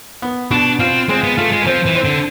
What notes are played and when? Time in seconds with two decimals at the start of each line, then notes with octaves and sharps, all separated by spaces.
0.22 B3
0.51 B2 D4
0.80 C4 F4
1.09 G#3 C4
1.24 B3
1.37 A3 F4
1.52 G#3
1.62 E3
1.66 F3 C4
1.86 E3
1.95 C4
2.05 D3